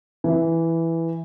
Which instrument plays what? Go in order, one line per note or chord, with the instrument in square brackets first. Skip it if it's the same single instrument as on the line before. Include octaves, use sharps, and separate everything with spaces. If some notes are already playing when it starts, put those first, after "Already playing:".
[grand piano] E3